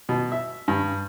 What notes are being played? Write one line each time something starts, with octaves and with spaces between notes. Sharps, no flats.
B2
E5
G2